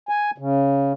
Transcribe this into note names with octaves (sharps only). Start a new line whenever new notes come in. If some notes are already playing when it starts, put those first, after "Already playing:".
G#5
C#3